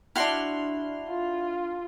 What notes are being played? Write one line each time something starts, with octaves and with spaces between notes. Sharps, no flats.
D4 E4 F#4 C6 F6
F4